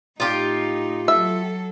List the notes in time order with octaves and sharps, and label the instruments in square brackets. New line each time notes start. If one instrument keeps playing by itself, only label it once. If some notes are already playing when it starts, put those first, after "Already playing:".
[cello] A2 D#4 [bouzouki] F4 G4
[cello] F#3 A4 [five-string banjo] E5